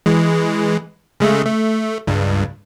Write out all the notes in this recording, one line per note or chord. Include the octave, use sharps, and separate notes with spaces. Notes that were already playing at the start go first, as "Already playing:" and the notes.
E3 G#3
C#3 G#3 A3
A3
C#2 G2